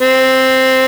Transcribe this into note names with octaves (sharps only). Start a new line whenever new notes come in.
C4